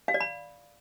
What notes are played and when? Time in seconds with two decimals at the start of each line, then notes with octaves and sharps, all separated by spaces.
0.08 F5
0.14 D5
0.20 B5